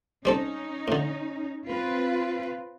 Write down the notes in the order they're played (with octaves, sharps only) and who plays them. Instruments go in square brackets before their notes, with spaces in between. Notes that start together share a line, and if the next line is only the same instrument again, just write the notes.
[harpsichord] G3 C4 A4 [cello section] C#4 D#4
[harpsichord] A2 D3
[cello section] C4 F4 B4